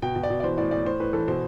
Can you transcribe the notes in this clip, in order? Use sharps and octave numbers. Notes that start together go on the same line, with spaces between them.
B2 G5
B2
D5
B2
D5
E3 C5
A2 D5
A2 D5
A2 C5
A2 B4
E3 A4
B2 C5